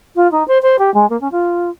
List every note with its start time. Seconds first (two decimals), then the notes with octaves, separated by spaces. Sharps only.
0.16 F4
0.31 D#4
0.48 C5
0.62 C5
0.78 G4
0.94 G#3
1.10 A#3
1.21 C#4
1.32 F4